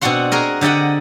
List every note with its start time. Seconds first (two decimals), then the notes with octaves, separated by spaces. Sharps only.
0.01 B2 C4 D4 F#4 F#5 C6
0.32 F#4 G#4 A#4 D#5
0.61 D3 G4 D5 D#5 F#5